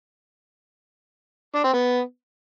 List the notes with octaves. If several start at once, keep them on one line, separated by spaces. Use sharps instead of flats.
D4
C4
B3